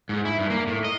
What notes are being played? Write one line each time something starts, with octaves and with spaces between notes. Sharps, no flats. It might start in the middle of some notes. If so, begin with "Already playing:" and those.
G#2
E4
G2
A#3
A2
D#5